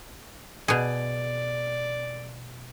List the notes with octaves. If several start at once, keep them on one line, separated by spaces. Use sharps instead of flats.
B2 G#4 D5